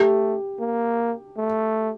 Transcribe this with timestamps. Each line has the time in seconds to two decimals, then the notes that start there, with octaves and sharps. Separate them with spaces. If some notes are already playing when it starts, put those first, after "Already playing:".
Already playing: A3 G4
0.60 A#3
1.37 A3